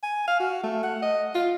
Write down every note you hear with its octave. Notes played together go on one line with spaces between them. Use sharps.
G#5
F5
F#4
A3
F#5
D#5
F4